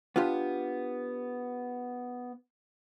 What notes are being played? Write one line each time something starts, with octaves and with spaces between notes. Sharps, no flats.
B3 D4 F4 G4